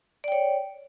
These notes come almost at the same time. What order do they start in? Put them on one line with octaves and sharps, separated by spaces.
D5 G5 C#5